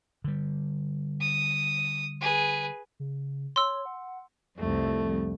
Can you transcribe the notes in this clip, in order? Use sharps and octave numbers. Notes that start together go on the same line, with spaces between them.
D3 G3
D#6
G#4 B4
C#3
C#5 C6 E6
F#5
C2 F2 A3